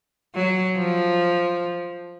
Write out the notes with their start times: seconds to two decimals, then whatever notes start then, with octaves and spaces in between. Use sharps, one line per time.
0.35 F#3
0.77 F3